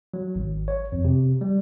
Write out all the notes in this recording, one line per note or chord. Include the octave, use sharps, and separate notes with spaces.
F#3
G#1
C#5
F2
C3
G3